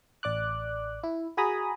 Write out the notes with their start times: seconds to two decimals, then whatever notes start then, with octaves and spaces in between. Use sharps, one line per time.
0.23 A1 D5 D6 F#6
1.03 E4
1.37 F#4 G#4 G#5 A#5 B5 D#6